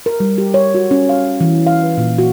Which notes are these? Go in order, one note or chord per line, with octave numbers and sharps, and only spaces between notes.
A#4
G3
G4
C#5
F#4
C#4
F5
E3
F5
B4
A#2
F#4